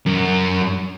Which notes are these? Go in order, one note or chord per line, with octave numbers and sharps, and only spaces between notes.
F#2